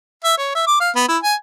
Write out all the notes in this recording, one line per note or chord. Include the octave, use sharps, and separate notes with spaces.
E5
C#5
E5
D6
F5
B3
E4
G#5